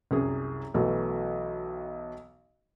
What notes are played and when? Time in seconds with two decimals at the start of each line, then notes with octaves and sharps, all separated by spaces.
0.11 C2 F#2 G#4
0.74 B1 E3 F#3 A3